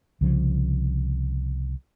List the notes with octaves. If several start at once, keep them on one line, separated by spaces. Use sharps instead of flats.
C2 C#3 F3